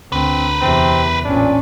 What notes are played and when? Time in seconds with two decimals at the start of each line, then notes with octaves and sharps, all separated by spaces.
0.12 D2 C4 A#4 B4
0.61 E2 C3 C4
1.25 A1 A#2 C#4 D4